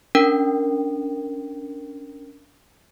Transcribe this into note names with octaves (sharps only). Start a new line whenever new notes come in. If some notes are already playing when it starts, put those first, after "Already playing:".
C#4 D4 A#4 G5